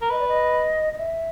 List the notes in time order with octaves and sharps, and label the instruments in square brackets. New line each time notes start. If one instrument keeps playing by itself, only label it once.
[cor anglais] A#4
[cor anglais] B4 [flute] D#5
[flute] D5
D#5
D#5
E5